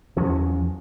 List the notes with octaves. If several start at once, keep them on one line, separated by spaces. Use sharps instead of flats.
E2 F3 F#3 C#4